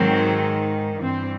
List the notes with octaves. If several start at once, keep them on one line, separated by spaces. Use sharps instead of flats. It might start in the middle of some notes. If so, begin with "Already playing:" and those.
Already playing: G#2 D#3 F#3 C4
G2 E3 C4